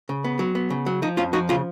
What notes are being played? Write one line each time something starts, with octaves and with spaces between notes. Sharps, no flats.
C#3
B3
F#3
B3
C#3
F#3
F3 D#4
F2 C#4 F4
F3 D#4 F#4
C#3 C#4 F4